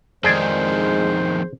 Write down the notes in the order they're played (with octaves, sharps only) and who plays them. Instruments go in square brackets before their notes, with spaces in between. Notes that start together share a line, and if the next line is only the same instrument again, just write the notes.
[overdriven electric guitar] F2 D#3 [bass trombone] G#3 [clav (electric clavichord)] G#4 D5 [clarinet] C5